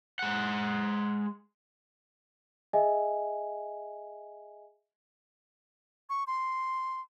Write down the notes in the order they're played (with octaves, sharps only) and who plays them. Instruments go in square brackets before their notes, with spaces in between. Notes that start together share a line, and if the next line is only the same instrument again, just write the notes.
[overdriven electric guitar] G#3 F#5
[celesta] G#4 D#5 E5 G#5
[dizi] C#6
C6